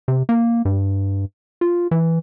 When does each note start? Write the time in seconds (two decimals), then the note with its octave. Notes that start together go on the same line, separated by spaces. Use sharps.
0.08 C3
0.29 A#3
0.65 G2
1.61 F4
1.91 E3